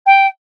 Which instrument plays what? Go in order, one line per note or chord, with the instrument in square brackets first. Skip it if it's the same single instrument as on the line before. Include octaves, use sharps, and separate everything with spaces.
[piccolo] G5